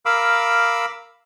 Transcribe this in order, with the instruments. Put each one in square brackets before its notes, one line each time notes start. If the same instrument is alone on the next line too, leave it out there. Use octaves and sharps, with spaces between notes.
[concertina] A#4 F5 B5 D6 E6